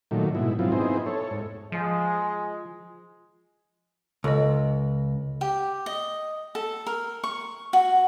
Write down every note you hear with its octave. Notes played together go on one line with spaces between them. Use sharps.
A#2 D#3 F#3 A3
G#2 B2 E4
G#2 F3 F#3 C4 E4 F4
B3 C4 D#4 E4 G#4 C5
A4 C#5
G#2
F3 G#3
C#2 A4 D#5
G4
D#5
A4
A#4
C#6
F#4